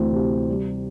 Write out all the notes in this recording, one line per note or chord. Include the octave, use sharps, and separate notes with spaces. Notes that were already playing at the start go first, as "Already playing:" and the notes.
Already playing: D2 E3 C4
C3
G3